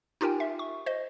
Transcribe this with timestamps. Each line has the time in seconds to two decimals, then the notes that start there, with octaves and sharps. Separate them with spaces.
0.21 D#4 F4 G4 A#4 G5 G#5
0.40 E5
0.59 C#6
0.86 C5 D#5